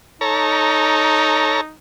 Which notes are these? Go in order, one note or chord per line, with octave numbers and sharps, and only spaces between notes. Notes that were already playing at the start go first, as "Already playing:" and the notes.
D#4 A4 C#5 A#5